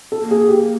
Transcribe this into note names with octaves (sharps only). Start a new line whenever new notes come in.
A4
A#3
G#4
G4